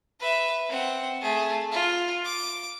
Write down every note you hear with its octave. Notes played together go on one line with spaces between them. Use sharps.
B4 E5
C4 F#5
A3 G#4
F4
D6